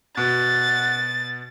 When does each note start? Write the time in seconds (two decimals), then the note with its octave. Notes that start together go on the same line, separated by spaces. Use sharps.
0.17 B2 F#5 A6